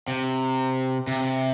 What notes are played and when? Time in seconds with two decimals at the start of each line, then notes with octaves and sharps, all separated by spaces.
0.08 C3
1.07 C3